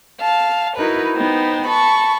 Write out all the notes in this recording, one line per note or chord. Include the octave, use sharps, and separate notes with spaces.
F5 A5
D#4 E4 F#4 A#4 B4
B3 D#4 C5 G5
A5 B5 C#6